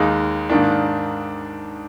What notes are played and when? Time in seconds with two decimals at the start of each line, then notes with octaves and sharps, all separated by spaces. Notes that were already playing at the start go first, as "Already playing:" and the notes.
Already playing: D#2 D#3 G#3 D#4
0.49 G#2 D#3 A#3 D4